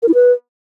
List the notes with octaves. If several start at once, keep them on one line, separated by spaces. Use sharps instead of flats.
A#4
E4
B4